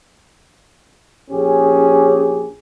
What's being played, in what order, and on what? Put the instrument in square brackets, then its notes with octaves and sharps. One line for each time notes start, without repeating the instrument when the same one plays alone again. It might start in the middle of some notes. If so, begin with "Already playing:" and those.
[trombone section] A#1 G4 G#4 [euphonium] C#4